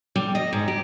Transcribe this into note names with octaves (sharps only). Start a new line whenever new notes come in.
G3
D#5
G#2
G4